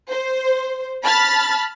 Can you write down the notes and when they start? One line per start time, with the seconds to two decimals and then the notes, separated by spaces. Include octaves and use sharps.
0.10 C5
1.03 A5 B5 F6 A6